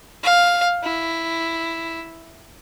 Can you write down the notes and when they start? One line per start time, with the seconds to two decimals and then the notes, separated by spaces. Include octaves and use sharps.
0.23 F5
0.83 E4